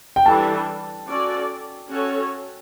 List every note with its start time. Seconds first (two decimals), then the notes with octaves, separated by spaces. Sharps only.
0.16 G5
0.26 E3 G3 D4 A4 A5
1.08 C#4 F#4 A4 D5
1.89 C#4 F#4 A4 C#5